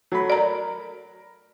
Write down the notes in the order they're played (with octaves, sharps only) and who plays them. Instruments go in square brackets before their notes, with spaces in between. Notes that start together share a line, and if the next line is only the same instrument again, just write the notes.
[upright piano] F#3 A3 B5
[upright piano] A#4 [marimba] D5 A#5